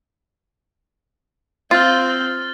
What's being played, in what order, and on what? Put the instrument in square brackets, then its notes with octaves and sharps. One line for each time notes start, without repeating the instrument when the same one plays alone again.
[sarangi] C4 [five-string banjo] F4 [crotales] F6 A6